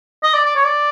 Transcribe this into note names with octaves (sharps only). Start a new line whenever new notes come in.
D#5
D5
D5
C#5
D5